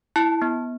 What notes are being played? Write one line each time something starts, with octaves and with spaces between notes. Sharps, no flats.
E4 A5
B3